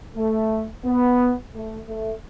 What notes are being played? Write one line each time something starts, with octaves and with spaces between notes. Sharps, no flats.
A3
B3
A3
A3